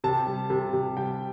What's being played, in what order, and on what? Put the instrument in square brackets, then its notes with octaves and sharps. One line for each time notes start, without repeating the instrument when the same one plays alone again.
[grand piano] C3 A5
G3
C3
C3
G3 G5